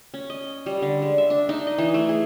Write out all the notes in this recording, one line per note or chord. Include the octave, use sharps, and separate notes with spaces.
C#4
D#5
G3
D3
G#3
E5
D4
D#4
D#5
E3
A3
G#4